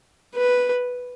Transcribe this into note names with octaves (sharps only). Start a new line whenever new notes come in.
B4